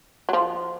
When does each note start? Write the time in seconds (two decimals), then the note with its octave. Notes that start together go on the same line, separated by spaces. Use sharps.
0.29 F#3
0.33 F3